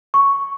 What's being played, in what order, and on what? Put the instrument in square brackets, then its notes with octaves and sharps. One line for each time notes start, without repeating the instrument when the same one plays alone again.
[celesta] C#6